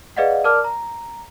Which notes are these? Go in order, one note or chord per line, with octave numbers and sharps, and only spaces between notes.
G#4 B4 D5 D#5 F5 F#5
A#4 D5 A5 D6 F6
A#5